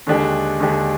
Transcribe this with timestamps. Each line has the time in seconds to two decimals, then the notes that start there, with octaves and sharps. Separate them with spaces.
0.07 D#2 D3 G#3 D4 G4
0.60 D#2 D3 G#3 D4 G4